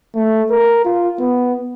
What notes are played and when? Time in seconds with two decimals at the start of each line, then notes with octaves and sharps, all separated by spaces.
0.15 A3
0.50 A#4
0.85 F4
1.19 B3